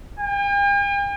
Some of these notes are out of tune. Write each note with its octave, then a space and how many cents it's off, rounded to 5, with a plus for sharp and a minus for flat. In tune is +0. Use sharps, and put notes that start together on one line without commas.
G5 +45